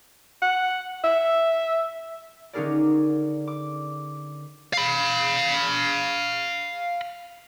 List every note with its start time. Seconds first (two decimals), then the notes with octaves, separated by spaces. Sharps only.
0.42 F#5
1.04 E5
2.53 D3 C#4 D#4 G#4 A#4 D5
3.47 D6
4.73 F5 B5